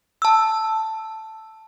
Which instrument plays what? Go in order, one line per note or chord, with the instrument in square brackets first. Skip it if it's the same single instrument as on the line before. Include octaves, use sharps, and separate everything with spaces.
[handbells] A5 E6